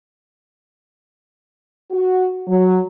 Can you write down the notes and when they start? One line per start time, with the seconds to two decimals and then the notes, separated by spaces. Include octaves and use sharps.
1.91 F#4
2.47 F#3